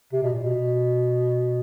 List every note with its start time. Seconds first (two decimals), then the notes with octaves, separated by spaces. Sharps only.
0.13 C3
0.23 B2
0.33 A#2
0.43 B2